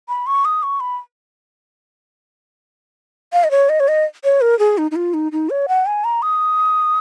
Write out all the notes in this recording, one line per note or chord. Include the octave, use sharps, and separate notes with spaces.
B5
C#6
D#6
C#6
B5
F5
D#5
C#5
D#5
C#5
D#5
C#5
A#4
G#4
D#4
D#4
F4
D#4
D#4
C#5
F#5
G#5
A#5
D#6